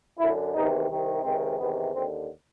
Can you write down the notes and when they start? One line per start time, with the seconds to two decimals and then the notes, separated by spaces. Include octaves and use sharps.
0.19 F#2 D3 E4
0.53 E2 C3 D#3 D#4
0.89 C2 C3 D#3
1.23 C#2 C3 D#3 C4
1.58 E2 C3 D#3 B3
1.93 D#2 D3 C4